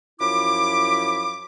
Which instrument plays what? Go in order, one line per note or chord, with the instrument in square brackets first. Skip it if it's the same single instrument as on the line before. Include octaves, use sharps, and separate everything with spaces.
[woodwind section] F#2 F3 E4 B5 D6